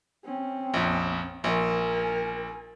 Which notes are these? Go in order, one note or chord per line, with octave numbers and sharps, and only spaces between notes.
C4 C#4
A#1 F2
A#1 A#4 G#5